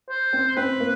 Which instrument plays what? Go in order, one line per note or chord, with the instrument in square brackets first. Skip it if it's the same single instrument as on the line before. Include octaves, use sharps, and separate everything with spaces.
[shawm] C5
[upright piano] C4
[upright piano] C4 [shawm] B4
[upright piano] A#3